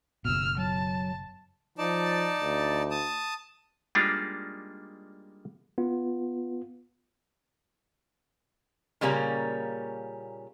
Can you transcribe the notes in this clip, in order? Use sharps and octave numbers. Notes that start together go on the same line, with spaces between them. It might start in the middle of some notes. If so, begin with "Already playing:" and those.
F#1 B2 E6 F6
F#3 A5
F3 D#4 D5 A5
D2
A5 D#6
G3 G#3 A#3 D4 D#4 F4
B3 F4
A#2 C#3 G3 A#3 C#4 A#5